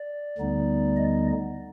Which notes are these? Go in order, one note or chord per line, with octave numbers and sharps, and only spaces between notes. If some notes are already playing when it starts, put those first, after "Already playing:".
Already playing: D5
D2 D3 G3 B3 D#4
D#5